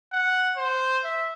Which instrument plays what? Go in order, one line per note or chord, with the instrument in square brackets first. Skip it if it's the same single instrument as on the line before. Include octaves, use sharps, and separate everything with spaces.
[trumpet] F#5
C5
E5